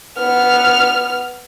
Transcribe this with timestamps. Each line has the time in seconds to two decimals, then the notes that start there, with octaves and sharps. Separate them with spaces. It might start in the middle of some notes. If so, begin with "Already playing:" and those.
0.19 B3 F6